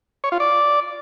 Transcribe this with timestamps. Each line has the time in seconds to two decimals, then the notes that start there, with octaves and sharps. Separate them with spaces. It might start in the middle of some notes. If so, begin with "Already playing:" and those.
0.24 C#5
0.32 F4
0.40 D5